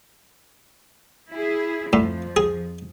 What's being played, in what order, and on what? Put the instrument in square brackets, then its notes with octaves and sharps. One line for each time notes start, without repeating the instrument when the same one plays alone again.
[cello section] E4 G#4
[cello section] F2 F3 [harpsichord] A2
[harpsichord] G#4